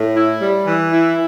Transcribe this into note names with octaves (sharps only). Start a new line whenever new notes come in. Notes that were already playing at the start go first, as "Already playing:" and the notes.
Already playing: A2
E4
G3
E3
E4